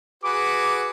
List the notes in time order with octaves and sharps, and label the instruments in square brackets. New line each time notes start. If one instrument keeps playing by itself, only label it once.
[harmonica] F#4 G#4 B4 [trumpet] D6